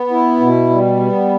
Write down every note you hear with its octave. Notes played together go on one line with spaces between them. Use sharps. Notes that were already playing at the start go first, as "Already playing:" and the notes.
Already playing: B3
E4
B2
G3
B3